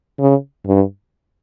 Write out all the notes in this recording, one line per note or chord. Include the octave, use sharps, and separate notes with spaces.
C#3
G2